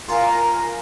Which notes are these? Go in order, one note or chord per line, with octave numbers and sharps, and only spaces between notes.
F4 A#4 F5 G#5 A#5